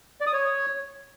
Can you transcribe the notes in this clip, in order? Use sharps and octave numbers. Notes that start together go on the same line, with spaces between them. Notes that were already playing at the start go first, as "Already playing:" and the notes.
D5
D#6
C#5